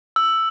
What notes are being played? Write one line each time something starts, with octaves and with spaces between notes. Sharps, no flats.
E6